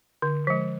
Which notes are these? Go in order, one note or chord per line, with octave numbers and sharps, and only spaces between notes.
D3
F3 G#3